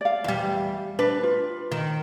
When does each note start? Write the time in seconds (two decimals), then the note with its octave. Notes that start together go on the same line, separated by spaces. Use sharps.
0.01 D5 F5
0.24 E2 G3
0.99 D4 B4
1.23 F4
1.72 D#3